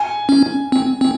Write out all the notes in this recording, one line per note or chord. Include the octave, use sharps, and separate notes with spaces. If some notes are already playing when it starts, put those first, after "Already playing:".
Already playing: G#5
C#4
C4
C4